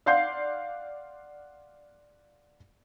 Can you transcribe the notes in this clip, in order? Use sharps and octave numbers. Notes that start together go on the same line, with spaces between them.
D5 F5 F#5 C6 G6 C7